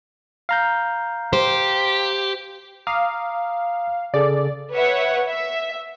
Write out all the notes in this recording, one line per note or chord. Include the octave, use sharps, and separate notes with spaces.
F5 A#5 G6
G4 C5
F5 A#5 D6 D#6
C#3 G#4 A4 D5
B4 C#5 E5 F#5
E5